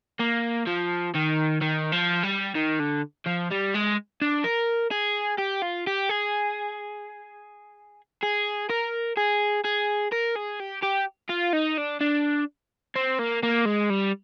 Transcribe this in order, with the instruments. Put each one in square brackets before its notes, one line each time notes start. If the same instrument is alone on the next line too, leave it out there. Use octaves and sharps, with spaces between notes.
[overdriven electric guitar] A#3
F3
D#3
D#3
F3
G3
D#3
D3
F3
G3
G#3
D4
A#4
G#4
G4
F4
G4
G#4
G#4
A#4
G#4
G#4
A#4
G#4
G4
G4
F4
D#4
D4
D4
C4
A#3
A#3
G#3
G3